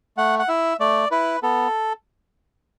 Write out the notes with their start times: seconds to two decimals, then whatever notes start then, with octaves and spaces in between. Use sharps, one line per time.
0.17 A3 F#5
0.39 F#5
0.48 E4 E5
0.80 A3 D5
1.11 E4 B4
1.43 B3 A4